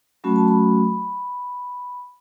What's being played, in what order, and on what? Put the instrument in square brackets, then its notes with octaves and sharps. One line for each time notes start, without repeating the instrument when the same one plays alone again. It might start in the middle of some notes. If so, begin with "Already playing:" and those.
[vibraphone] F#3 A3 C#4 F#4 B5
A5
B5